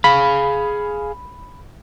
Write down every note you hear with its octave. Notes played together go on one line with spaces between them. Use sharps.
G#4 F5 B5